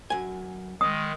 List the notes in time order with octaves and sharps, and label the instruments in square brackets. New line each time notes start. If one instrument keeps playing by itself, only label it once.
[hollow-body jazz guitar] F#2 G#5
[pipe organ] D#3 G#3 [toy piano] D#6